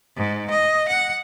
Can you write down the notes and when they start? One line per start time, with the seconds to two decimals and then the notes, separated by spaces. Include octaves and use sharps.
0.16 G#2
0.50 D#5
0.88 F#5